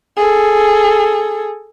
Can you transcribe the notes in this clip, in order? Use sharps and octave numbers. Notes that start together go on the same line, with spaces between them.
G#4 A4